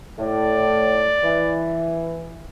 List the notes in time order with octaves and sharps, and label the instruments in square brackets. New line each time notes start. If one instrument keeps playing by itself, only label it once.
[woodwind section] A2 [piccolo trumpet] D5
[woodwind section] E3